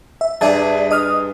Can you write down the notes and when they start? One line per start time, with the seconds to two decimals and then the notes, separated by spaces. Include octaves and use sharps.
0.21 E5
0.41 G2 G#4 D5 E5 A5
0.91 D#5 D#6 F6